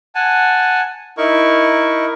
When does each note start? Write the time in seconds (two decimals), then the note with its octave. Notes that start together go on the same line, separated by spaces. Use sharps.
0.15 F#5 G#5 A5
1.17 D#4 E4 A#4 C#6